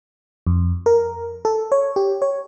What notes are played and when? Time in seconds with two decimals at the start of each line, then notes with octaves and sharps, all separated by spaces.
0.47 F2
0.86 A#4
1.45 A4
1.72 C#5
1.96 G4
2.22 C#5